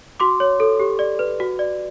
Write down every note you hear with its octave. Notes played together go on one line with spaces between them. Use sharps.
F#4 C6 D6
C#5
A4
G4
D5
B4
F#4
D5